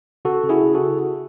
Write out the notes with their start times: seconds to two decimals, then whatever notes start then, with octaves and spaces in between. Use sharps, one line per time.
0.25 C#3 F#4 A4
0.44 C#3
0.49 E4 G#4
0.63 C#3
0.75 F#4 A4